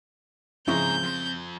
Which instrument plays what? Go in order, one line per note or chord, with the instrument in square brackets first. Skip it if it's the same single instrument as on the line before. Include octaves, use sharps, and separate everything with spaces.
[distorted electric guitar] G#2 A#5 [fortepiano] C#3 G#3 E4 [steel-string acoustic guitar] F3 C4 [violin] G6
[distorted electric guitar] F2 C6